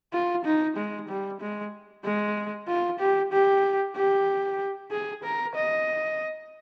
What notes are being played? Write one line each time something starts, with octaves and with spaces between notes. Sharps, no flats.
F4
D#4
G#3
G3
G#3
G#3
F4
G4
G4
G4
G#4
A#4
D#5